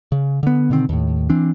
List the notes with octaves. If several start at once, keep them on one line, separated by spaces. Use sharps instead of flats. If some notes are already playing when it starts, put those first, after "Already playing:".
C#3
D3 B3
B2 D3 D#3 C4
D#2 A2
E3 C4 D4